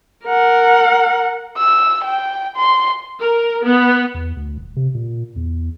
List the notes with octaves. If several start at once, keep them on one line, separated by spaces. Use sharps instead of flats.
A#4 F#5
E6
G5
C6
A#4
B3
E2
D2
D#1
C3
A#2
E2